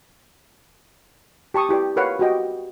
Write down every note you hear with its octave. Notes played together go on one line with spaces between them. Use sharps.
G4 A5 C#6 D#6
E4 G4 B4 D5
F4 A#4 B4 C#5 F5 F#5
F#4 G4 D#5 G5